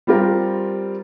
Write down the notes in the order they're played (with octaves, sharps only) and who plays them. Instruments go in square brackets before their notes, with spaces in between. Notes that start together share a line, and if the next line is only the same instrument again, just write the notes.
[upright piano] G3 C4 F4 G4 A#4